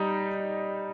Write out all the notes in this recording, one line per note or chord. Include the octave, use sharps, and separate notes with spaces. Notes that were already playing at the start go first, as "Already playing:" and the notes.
Already playing: G3 D#4